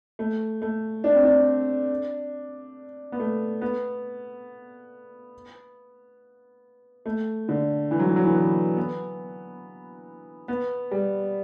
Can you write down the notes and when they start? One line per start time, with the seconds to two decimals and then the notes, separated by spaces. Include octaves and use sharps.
0.19 A3
0.62 A3
1.04 D4
1.15 C4
1.25 D4
3.12 B3
3.20 A3
3.61 B3
7.06 A3
7.49 D3
7.91 E3
7.99 F#3
8.08 E3
8.16 F#3
8.24 E3
8.34 B3
8.77 B3
10.48 B3
10.91 G3